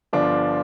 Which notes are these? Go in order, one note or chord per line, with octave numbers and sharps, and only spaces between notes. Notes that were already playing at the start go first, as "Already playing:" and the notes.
G1 G2 D3 F3 D4 F4